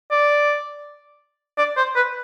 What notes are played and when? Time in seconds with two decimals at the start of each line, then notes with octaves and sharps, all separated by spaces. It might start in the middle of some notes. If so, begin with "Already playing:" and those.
0.11 D5
1.58 D5
1.77 C5
1.95 B4